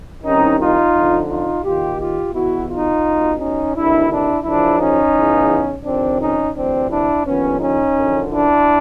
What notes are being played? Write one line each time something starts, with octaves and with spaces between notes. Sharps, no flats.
C2 C3 D#3 C#4 D#4
D#4 F4
F2 D3 F3
D#4 F4
D#2 D#3 F4 G4
F4 G4
E2 B2 E4 F#4
D#4 F4
C#2 B2
C#4 D#4
D2 C3 D#3 D4 E4
D4 E4
F#2 C#3 F3 D4 E4
C#4 D#4
E2 C#3 E3
F2 C3 D#3 C4 D4
C#4 D#4
D2 C3 E3 C4 D4
D4 E4
D#2 D3 F3 B3 C#4
C#4 D#4
F#2 D3 F3
D4 E4